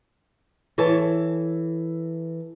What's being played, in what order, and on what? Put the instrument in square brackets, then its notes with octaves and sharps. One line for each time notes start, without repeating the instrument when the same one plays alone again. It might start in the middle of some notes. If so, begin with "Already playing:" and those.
[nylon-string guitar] E3 A4 C#5 A5